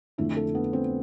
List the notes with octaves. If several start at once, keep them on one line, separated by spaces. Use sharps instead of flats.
F2 D3 F3 A3 E4
A4
B3
C4